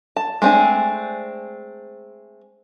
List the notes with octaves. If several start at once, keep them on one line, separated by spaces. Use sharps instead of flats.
A5
G#3 A3 C4 D4 G#5